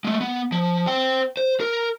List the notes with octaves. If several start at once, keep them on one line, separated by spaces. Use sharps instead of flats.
G#3 A3
B3
F3
C5 G5
C5
A#4